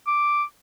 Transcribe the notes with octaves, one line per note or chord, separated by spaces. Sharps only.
D6